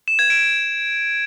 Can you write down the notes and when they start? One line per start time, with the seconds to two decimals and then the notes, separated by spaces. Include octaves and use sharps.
0.08 E7
0.19 G#6
0.30 D7